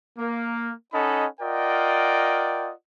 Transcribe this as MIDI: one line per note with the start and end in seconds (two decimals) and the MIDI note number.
0.18 0.72 58
0.93 1.26 61
0.93 1.26 63
0.93 1.26 69
0.93 1.26 75
0.93 1.26 78
0.93 1.26 83
1.41 2.71 65
1.41 2.71 70
1.41 2.71 74
1.41 2.71 75
1.41 2.71 78
1.41 2.71 79